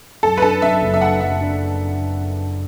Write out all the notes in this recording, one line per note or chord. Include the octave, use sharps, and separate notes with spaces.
F#2 A4
B4
D4 A4
F#3 E5
F#1
E5
D4 F#5
F#2 E5
D4